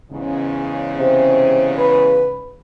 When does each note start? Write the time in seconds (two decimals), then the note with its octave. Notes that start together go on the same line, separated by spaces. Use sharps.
0.12 E2 G#2 C#3
0.99 C3
1.78 B4